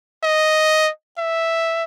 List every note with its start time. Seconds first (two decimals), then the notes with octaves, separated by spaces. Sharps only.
0.24 D#5
1.18 E5